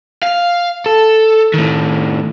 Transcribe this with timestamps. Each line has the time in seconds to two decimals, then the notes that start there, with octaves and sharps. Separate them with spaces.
0.23 F5
0.86 A4
1.54 A2 D#3